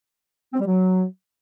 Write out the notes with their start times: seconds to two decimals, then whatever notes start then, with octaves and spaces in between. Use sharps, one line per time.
0.53 C4
0.59 G3
0.65 F#3